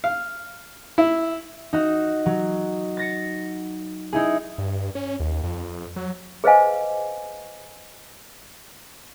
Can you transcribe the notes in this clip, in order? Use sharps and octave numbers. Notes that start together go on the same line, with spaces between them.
F5
E4
D#4 F#4
F#3
A6 A#6 C#7
D#4 E4 G#4
G2
C#4
D#2
F2
F#3
G#4 B4 C5 D#5 F5 G#5